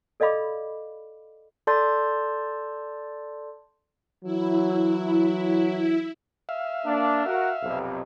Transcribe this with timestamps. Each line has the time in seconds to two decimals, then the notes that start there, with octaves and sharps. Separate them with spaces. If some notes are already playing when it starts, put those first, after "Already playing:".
0.20 A4 D5 D#5 F5 B5 D6
1.67 A4 D5 A5 C6 G6 A6
4.24 E3 F#3 E4
6.49 E5 F5
6.86 A#3 D4
7.26 F#4 A#4 F#5
7.63 B1 F2 C3